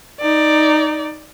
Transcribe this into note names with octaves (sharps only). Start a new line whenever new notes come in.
D#4 D5